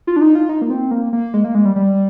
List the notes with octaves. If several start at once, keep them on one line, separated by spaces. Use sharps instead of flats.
F4
D4
D#4
F4
D#4
A#3
C4
A#3
A#3
G#3
A#3
G#3
G3
G3